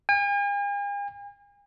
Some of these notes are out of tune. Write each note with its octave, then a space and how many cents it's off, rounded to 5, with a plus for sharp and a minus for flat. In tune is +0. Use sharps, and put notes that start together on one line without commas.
G#5 -45